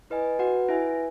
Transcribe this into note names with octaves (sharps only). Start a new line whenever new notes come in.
E4 B4 D#5 G#5
F#4 B4 F#5
E4 B4 E5 G#5